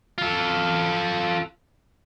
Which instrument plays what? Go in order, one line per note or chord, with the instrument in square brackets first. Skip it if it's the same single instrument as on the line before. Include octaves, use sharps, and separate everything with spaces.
[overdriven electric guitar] F4 A4